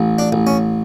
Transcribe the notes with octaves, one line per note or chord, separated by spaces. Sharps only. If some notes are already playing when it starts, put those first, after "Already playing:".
Already playing: A1
D4
A1
C#4